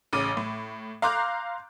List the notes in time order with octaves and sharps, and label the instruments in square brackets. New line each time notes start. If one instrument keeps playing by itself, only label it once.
[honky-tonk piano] A1 C#3 D6 D#7
A2
F5 A#5 C6 D6 F#6 G6